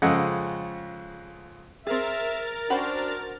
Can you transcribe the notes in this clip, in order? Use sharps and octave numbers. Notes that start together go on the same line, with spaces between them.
F2 C#3 G#3 A4 D#5 F#5
C4 G#4 A#4 E5 F6 A6
C#4 D4 F#4 C5 G5 B5